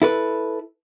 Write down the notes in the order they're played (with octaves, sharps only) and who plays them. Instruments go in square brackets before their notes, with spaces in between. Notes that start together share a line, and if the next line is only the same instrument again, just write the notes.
[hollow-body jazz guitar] E4 A4 B4